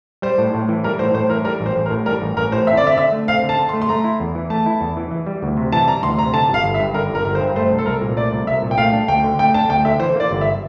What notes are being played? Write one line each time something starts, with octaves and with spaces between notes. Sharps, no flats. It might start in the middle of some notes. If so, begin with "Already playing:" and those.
G3 C5
A2
A2
E3
G3 A#4
A2 C5
A2 C5
E3 A#4
G3 A#4
A1
C5
A1
A#4
A2
G3 A#4
A1
A1 A#4
A2 C5
C4 E5
D5
D3 E5
D3 E5
A3
C4 F5
D3
A5
D3
C6
A3
C6
A3 A#5
E4
E2
E3
A3 A5
E4
E2
E3
E3
G3
D2
C3
E3 A5
G3 A#5
D2 C6
C3 A#5
D3 A5
G1 F5
G1
E5
G2
D3 A#4
G1 A#4
G1 A#4
C5
G2
A3 C5
C2
A4
C2 A#4
A#2
A3 D5
C2
C2 E5
A#2
G5
A3 F5
D4
D2 G5
D3
A3 G5
D4 A5
D2 G5
D3 E5
E3 C5
A#3 D5
G1
E5